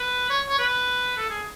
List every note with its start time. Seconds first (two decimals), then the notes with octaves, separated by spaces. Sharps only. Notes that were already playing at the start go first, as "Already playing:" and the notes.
Already playing: B4
0.30 C#5
0.49 C#5
0.59 B4
1.17 A4
1.30 G#4